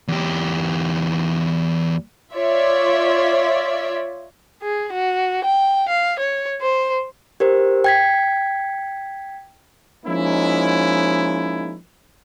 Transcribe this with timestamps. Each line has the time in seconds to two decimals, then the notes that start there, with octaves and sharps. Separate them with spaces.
0.08 E2 G4
2.34 F4 C#5 D5 E5
4.63 G#4
4.93 F#4
5.45 G5
5.89 F5
6.19 C#5
6.61 C5
7.40 G4 A#4 C5
7.84 G5 G#6 B6
10.06 F3 G#3 A#3 C#4 D#4 E4